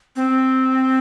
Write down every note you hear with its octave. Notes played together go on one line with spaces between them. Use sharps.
C4